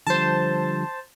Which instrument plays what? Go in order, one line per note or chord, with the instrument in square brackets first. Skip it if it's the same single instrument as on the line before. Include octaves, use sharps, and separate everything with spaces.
[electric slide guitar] D3 F3 G3 [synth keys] C5 A5